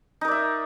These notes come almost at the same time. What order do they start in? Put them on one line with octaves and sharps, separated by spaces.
D#4 A#4 D5 E5